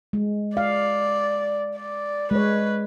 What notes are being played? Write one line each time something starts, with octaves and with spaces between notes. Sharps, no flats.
G#3
D5 F5
D5
G#3 B4 C#5